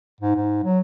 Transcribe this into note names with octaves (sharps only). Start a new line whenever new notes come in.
G#2
G#2
F#3